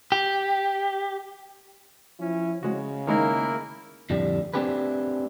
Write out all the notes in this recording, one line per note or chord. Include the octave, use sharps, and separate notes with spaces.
G4
F3 C#4 E4
C#3 G#3 F#4
D#3 G#3 A#3 D#4 E4 A#4
F2 A2 D3 G3
A3 C4 D4 G4 G#4 B4